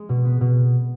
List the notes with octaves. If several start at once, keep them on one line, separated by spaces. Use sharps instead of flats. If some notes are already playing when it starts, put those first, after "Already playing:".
Already playing: G#3
B2
B3
B2